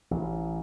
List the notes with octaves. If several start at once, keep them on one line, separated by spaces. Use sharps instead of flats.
A1